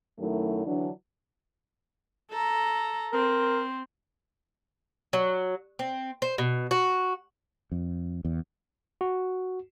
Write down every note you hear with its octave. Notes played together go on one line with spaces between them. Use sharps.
F#2 D#3 F#3 A3 E4
D3 E3 F#3 D4
A4 A#5
C4 A#4
F#3
C4
C5
B2
F#4
F2
E2
F#4